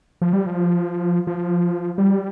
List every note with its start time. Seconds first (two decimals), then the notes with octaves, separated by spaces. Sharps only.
0.22 F3
0.33 G3
0.46 F3
1.27 F3
1.98 G3